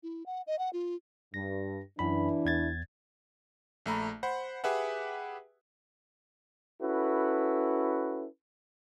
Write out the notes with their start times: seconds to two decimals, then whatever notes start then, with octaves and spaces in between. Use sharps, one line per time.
0.03 E4
0.26 F#5
0.47 D#5
0.59 F#5
0.73 F4
1.34 G2 A#6
1.99 F#2 E3 D4 E4 B5
2.45 E2 G#6 A6
3.86 A#1 A3 A#5 B5
4.23 C5 F#5 B5
4.64 G4 G#4 B4 E5 F#5
6.82 C#4 E4 F#4 A4 B4